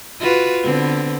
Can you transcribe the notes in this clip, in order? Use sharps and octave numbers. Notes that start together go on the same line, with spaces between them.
F4 F#4 B4
D3 B3 C4